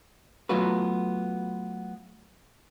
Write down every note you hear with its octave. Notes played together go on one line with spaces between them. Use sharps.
F#3 A3 B3 F4 F#4 B4